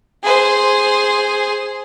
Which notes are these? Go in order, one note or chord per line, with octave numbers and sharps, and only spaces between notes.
G#4 C5